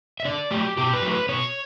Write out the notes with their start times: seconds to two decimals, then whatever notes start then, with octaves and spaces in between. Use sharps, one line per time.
0.20 E5
0.25 D3 D5
0.51 F#3 A3 G4
0.77 B2 G4
0.94 B4
1.02 F#3 A3
1.11 B4
1.29 B2 C#5